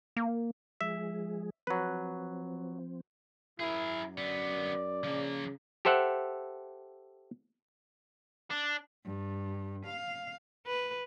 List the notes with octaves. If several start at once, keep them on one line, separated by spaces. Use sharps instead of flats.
A#3
F3 G#3 G#4 E5
F3 F#3 C4 B4
F#2 E4 G#4 A#4
D3 B3 D5
C#3 F3 A#3
G4 A4 C5 E5 F#5
D4
G2
F5
B4